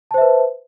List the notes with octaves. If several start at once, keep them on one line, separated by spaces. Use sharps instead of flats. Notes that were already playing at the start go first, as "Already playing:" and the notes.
B4 C5 E5 A5